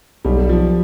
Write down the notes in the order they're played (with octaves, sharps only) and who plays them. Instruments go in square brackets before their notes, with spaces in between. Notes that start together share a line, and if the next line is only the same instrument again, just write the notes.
[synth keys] B1 [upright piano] G3
[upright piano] F3